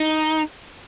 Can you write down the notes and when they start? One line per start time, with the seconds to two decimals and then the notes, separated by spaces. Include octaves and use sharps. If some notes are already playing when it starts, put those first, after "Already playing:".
Already playing: D#4